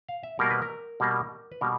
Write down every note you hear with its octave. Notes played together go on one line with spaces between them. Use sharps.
F5
E5
B2 G3 A#3 A#4
B4
A#4
B2 G3 A#3
B4
B2 G3 A#3 A#4